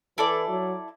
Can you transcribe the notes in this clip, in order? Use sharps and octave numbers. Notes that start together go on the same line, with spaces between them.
E3 E4 A4 D5
F#3